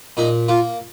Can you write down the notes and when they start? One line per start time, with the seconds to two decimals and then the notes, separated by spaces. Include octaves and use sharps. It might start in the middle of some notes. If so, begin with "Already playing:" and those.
0.17 A#2 D#4
0.48 A#3 F4